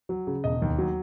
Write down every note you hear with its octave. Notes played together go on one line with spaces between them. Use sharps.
F#3
C#3
E1 D#5
D#2
F#3